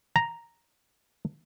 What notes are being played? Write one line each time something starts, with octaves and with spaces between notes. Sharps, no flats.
A#5